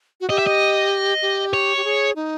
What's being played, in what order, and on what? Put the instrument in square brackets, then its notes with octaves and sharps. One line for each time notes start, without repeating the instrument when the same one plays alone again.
[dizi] F#4
[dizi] G4 [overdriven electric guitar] D#5
[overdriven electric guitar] E5
D#5
[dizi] G4
[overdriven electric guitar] C#5
[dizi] G4
G#4
D#4